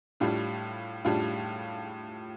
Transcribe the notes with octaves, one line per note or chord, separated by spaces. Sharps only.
A2 G3 D4 F4
A2 G3 D4 F4